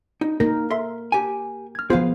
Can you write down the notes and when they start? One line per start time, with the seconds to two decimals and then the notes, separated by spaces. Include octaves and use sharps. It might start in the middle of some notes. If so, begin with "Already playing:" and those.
0.21 D#4
0.40 A#3 D#4 A#4 A#6
0.71 A4 E5 C6
1.12 G4 G#5
1.75 F6 G#6
1.90 F3 B3 F4 G#4 B4 C5 F5